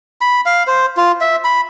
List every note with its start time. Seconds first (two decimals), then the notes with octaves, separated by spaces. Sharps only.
0.21 B5
0.46 F5
0.67 C5
0.97 F4
1.21 E5
1.44 B5